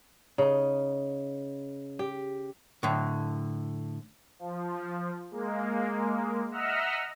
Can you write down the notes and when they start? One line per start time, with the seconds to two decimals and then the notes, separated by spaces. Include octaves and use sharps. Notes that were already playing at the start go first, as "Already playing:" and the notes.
0.38 C#3 D#4
1.99 G4
2.83 A2 D3
4.39 F3
5.31 G#3 A#3
6.51 D#5 E5 F#5 A#5 E6 F6